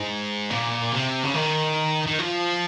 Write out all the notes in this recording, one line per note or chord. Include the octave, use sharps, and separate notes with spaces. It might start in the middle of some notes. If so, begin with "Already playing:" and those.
Already playing: G#2
A#2
C3
C#3
D#3
D#3
F3